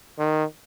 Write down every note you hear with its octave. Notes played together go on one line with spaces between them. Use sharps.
D#3